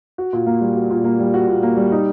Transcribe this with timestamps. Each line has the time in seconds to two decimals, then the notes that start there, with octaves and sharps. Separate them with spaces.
0.18 F#4
0.33 A#2
0.46 A#3
0.61 G3
0.76 F#4
0.90 A#2
1.04 A#3
1.19 G3
1.34 F#4
1.48 A#2
1.63 A#3
1.77 G3
1.92 D#4